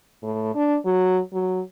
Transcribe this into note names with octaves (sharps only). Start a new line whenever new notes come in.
A2
D4
F#3
F#3